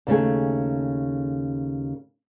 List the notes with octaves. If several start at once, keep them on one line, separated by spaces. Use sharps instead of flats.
D#2 C#3 A3 G#4